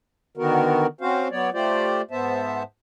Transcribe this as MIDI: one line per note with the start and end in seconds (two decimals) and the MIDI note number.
0.37 0.87 50
0.37 0.87 51
0.37 0.87 59
0.37 0.87 66
0.37 0.87 70
1.01 1.28 60
1.01 1.28 61
1.01 1.28 66
1.01 1.28 72
1.01 1.28 77
1.31 1.50 54
1.31 1.50 59
1.31 1.50 73
1.31 1.50 74
1.54 2.02 57
1.54 2.02 65
1.54 2.02 67
1.54 2.02 72
1.54 2.02 74
2.11 2.63 44
2.11 2.63 59
2.11 2.63 72
2.11 2.63 76
2.11 2.63 81